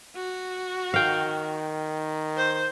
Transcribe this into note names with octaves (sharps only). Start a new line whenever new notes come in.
F#4
D#3 F5 G5
C5